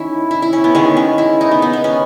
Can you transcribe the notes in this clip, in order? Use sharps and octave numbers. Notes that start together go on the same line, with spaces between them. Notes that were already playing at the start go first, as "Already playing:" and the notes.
Already playing: D#3 C#4 E4
E4
E4
C#4
B3
D#3 G#3 B3 C#4
C#4
E4
D#4
B3
B3
B3
C#4